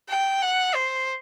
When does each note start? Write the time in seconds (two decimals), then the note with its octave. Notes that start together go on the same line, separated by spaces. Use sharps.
0.09 G5
0.42 F#5
0.75 C5